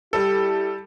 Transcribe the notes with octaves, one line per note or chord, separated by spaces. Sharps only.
G3 E4 G4 A4